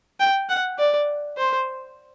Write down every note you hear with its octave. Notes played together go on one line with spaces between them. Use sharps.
G5
F#5
D5
C5